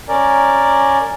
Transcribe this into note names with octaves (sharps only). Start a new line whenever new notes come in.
C#4 A#4 D5